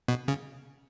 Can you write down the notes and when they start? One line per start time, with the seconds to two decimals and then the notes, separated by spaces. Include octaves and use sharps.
0.08 B2
0.28 C#3